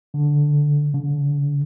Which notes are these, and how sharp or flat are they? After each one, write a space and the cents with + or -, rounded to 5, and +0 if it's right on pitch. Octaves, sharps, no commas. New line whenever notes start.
D3 -5
D3 -40